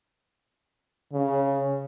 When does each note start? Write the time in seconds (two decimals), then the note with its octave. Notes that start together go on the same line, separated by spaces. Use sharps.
1.13 C#3